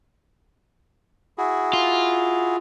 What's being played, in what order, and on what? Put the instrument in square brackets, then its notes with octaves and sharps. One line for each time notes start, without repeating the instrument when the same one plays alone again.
[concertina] E4 F#4 G#4
[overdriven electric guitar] F4